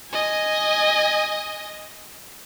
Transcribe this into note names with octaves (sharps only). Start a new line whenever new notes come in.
D#5 G#5